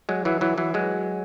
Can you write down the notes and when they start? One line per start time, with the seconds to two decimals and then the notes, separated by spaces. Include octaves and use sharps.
0.09 F#3 G#3
0.25 E3 F#3
0.41 E3 F#3
0.58 E3 F#3
0.74 F#3 G#3